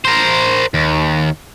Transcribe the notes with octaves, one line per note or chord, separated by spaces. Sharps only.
A#4 C5
D#2